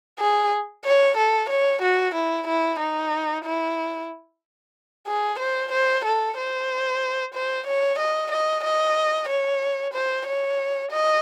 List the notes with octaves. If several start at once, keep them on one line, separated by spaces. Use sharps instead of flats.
G#4
C#5
A4
C#5
F#4
E4
E4
D#4
E4
G#4
C5
C5
A4
C5
C5
C#5
D#5
D#5
D#5
C#5
C5
C#5
D#5